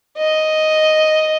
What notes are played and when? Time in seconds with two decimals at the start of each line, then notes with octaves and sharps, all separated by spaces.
0.17 D#5